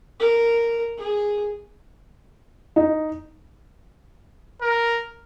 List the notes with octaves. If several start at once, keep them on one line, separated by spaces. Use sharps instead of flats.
A#4
G#4
D#4
A#4